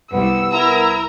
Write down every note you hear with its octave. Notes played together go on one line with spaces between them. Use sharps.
C2 B3 E6
E4 A#4 A#5